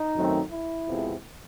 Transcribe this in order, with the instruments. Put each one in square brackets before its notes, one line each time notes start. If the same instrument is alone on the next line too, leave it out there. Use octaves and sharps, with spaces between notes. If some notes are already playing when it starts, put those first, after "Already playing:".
Already playing: [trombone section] D#4
F#2 D#3 F#3 A3 C4
E4
F2 C3 F3 G#3 B3